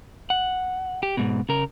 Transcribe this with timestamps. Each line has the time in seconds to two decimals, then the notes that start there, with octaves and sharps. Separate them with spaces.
0.30 F#5
1.03 G4
1.17 G#2 B2
1.49 C#3 A#4